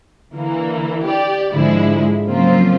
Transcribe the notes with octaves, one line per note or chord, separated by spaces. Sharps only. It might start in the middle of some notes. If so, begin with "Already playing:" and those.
D3 E3 A#3
G4 D5
G#2 D3 F3 G#3 E4 G#4
C#3 F3 F#3 A#3 C4 F4